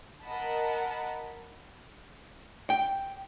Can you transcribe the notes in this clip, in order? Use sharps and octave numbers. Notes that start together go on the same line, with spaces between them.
A#4 D#5 F#5 A5 B5
G5